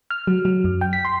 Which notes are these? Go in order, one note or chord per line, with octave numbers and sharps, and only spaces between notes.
F6
F#3
F#3
F#2
G5
B6
C6